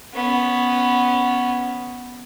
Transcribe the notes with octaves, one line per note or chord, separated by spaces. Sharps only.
B3 C#4